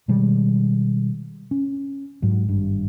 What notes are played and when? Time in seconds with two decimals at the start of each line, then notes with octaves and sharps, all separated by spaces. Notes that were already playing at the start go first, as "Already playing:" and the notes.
0.08 B2 D#3 G3 G#3
1.51 C#4
2.22 G#2 F#3
2.49 G#1 G2